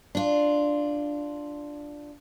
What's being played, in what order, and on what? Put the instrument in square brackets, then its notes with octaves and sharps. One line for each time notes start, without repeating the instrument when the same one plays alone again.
[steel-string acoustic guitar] D4 F4